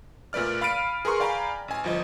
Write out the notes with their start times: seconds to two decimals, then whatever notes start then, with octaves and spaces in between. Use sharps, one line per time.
0.33 A#2 A3 B4 D5 F6
0.61 F5 B5 F6 A6 D7 D#7
1.05 G#4 A#4 B4 A#5 C6 C#6
1.20 D5 F5 G5 G#5 A#5 B5
1.68 A1 G#5
1.84 G1 F3 D#5